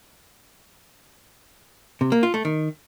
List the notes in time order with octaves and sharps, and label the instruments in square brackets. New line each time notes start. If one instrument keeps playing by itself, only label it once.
[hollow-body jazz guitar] C3
A#3
F4
A3
D#3